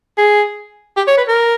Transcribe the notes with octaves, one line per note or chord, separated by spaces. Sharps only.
G#4
G4
C#5
B4
A#4